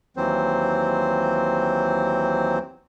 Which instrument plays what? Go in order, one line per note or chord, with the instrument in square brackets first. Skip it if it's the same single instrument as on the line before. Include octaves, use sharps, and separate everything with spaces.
[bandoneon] D#2 E3 F#3 C4 C5